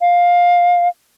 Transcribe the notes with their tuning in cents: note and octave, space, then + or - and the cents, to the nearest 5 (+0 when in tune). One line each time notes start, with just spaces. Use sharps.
F5 +15